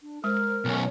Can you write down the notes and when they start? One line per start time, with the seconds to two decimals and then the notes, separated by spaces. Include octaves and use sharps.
0.01 D4
0.24 G#3 A#4 C5 F6
0.65 B1 C#4